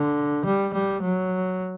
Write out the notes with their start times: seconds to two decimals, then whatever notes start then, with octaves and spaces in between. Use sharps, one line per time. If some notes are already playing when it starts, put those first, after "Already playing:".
Already playing: D3
0.45 G3
0.74 G3
1.02 F#3